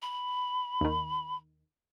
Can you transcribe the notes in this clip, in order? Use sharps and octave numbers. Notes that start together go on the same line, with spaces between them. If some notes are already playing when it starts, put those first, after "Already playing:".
B5
D#2 D#3